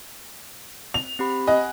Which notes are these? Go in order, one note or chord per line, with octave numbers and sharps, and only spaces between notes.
F7
C4 G4 B5
D#5 F#5 G#5 F#6